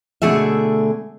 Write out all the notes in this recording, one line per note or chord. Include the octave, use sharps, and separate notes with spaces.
B2 D3 A3 G#4 E5